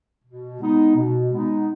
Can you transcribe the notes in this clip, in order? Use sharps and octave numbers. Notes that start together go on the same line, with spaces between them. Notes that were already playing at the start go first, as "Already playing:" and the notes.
B2
G#3 B3 D#4
B2
G#3 B3 D#4